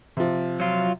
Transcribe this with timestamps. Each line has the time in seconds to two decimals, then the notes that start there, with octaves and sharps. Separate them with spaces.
0.17 C3 F3
0.60 F#3 F4